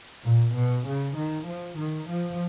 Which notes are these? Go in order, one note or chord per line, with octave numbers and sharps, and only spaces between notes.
A#2
B2
C#3
D#3
F3
D#3
F3